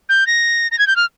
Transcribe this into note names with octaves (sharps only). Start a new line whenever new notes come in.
G6
A#6
A#6
G#6
G6
F6